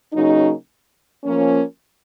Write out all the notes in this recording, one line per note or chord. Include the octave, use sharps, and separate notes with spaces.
C#3 F#3 A#3 D#4
F3 A#3 C#4